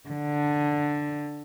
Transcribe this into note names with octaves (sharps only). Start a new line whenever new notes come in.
D3